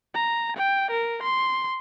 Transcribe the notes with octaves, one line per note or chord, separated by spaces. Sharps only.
A#5
G5
A#4
C6